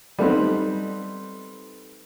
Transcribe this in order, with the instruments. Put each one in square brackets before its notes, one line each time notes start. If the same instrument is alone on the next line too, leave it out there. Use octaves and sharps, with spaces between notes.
[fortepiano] G3 A3 B3 C4 D#4